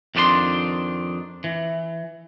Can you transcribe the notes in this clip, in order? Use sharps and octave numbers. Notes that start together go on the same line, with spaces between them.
F2 D#3 D4 G4 C6
E3